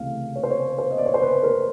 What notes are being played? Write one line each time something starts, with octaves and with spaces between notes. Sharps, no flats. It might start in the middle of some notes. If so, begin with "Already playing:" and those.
Already playing: C#2 C3 E3 A3 F5
C#5
C5
C#5
C5
D#5
D5
C#5
C5
B4
A#4